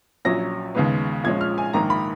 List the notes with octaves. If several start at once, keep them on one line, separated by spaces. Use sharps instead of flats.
A#1 A#2 F#3 C#4 A#6
D#2 C#3 G#3 B3
A#1 A#2 F3 G#3 C#4 G#6
F6
G#5
A#1 G#2 D#3 A#3 A#5
B5